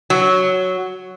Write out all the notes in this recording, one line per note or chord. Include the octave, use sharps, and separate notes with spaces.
F#3